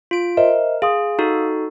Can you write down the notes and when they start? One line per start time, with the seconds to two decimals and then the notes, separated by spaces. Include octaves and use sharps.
0.11 F4 D7
0.37 A#4 C5 D#5 E5
0.82 G#4 F5 C6 D#6
1.19 D#4 F#4 A4